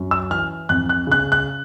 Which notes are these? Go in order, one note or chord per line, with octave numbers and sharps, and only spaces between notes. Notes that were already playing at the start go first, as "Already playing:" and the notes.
Already playing: F#2
E6
E3 F6
F2 F#6
F#6
C#3 F#6
F#6